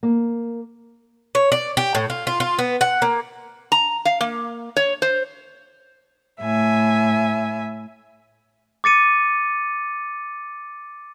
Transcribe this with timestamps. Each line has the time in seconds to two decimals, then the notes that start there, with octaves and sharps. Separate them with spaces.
0.03 A#3
1.35 C#5
1.52 D5
1.77 G4
1.95 A2
2.10 F4
2.27 F4
2.40 F4
2.59 B3
2.81 F#5
3.02 A#3
3.72 A#5
4.05 F5
4.21 A#3
4.77 C#5
5.02 C5
6.40 A2 E5 G#5
8.84 D6 A6 C#7 D#7